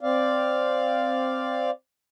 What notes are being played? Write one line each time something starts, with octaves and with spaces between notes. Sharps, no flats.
C4 D5 F5